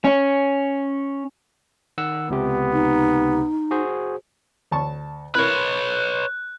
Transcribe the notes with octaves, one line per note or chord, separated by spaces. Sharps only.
C#4
D#3 F#5 E6
C#2 C3 B3 G4
D#4
F#4 G#4 C5
D2 A5 C#6
E4 A#4 B4 C#5 F#6